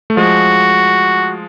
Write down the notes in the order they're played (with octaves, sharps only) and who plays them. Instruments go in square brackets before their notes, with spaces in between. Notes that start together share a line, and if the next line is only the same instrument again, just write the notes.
[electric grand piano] A3
[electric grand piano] F3 G#3 [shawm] F#4